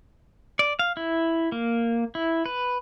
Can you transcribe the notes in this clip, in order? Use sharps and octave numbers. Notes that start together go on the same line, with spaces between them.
D5
F5
E4
A#3
E4
B4